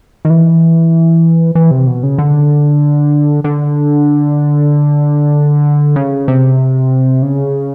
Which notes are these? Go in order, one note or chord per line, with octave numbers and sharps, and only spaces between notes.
D#3
E3
E3
C3
B2
C#3
D3
D3
C#3
C3
C#3